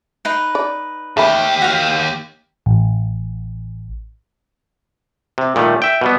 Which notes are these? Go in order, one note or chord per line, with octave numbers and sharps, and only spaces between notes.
D#4 B4
D5
D#2 A3 G4 B5
F#4 F5
A1
C3
A#2 D#3 G3 A3
E5 G5
B2 G3 B3